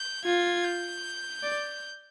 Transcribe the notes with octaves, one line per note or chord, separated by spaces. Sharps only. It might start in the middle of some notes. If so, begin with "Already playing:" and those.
Already playing: G6
F4 G#6
G6
D5